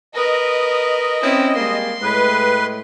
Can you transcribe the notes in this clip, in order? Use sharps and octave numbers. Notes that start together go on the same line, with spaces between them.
A#4 B4 D#5
C4 C#4 E4
G3 G#3 A#3 C6
A2 G#3 B4